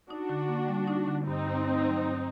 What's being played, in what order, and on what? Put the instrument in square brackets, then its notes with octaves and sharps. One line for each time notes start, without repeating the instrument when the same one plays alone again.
[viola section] D4 F#4 [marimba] D#4
[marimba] D3
A#3
G3
D#4
D3
[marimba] G2 [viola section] C4 D#4
[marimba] G2
A3
F#3
G2